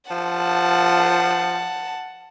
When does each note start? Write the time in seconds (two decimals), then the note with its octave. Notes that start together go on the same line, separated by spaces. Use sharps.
0.11 F3 F#5 A5